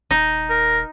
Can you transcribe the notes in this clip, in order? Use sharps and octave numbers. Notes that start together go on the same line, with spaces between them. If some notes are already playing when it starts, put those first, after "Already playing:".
D#1 D#4
A#4